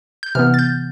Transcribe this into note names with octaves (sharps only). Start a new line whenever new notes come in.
G6
C3 E3 B3 F6
A6
G6